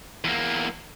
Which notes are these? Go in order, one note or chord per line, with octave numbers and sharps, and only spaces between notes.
E2 A#3